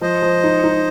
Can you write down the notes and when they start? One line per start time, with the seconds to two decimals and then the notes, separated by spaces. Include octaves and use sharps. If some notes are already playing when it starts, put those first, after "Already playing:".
0.01 F3 C5 D#5
0.22 F3
0.44 D#4
0.64 D#4